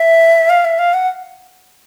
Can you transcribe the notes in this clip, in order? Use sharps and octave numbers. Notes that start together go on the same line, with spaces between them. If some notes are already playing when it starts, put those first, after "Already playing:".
Already playing: E5
F5
E5
F5
F#5